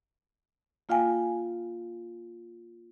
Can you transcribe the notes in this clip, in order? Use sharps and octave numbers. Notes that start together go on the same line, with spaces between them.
A#3 F4 F5 G5 G#5